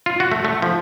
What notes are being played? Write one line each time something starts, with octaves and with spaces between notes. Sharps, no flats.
F4
F#4
A3
A3
F3